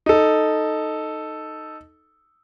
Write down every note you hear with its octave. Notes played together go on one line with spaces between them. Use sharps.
D#4 A4